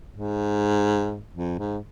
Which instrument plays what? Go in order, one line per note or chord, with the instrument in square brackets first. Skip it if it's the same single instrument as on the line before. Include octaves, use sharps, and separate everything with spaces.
[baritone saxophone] G#2
F2
G#2